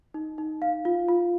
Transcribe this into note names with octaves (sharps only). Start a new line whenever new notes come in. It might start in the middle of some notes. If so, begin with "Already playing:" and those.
D#4
D#4
F5
F4
F4